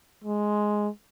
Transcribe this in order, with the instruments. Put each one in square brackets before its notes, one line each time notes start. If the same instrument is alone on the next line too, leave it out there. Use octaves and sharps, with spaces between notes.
[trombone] G#3